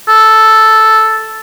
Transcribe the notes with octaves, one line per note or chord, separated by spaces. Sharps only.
A4